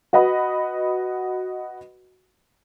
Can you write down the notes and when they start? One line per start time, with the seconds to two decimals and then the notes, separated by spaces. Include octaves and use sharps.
0.13 F#4 B4 D#5 F#5 B5